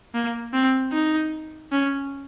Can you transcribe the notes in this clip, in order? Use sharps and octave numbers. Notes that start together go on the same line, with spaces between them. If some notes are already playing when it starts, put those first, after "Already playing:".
A#3
C4
D#4
C#4